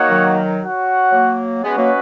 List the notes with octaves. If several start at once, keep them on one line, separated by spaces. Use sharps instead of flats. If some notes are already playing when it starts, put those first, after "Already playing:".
Already playing: A#3 D#4 F#4 C#5 F#5
D#3 F#3
F#4 C#5 F#5
F#3 A#3
G#3 B3 C#4 F#4 B4 D#5 F#5
F#3 A#3